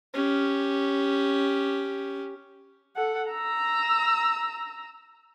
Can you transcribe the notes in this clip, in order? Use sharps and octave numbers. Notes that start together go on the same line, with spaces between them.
C#4 G4
A4 F#5
A#5 E6